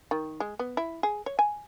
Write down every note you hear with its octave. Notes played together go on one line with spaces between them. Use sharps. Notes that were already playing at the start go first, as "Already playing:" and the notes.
D#3
G#3
B3
E4
G#4
C#5
G#5